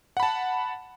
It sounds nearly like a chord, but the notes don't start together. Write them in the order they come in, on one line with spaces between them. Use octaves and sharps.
F#5 B5 A5